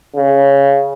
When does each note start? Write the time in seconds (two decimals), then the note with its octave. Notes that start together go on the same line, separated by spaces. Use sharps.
0.16 C#3